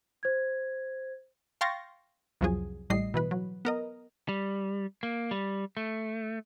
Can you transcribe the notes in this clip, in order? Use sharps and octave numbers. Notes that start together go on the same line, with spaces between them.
C5 G#6
F5 G5 C6 C#6 A6 A#6
C2 F2 F3 F#3 G#4
A1 A2 G3 D#5 C7
B2 E3 B4
F#3
B3 A#4 D#5
G3
A#3
G3
A3